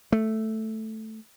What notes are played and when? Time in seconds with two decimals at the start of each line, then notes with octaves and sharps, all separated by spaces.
0.12 A3